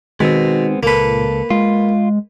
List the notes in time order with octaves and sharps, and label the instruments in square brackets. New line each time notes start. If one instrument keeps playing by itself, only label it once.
[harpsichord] B2 [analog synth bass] D#3 [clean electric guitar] G#3 B3 C4
[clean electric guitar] C#2 A4 [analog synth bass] A#2 [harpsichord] A#3 B4
[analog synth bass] G#3 [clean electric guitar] F4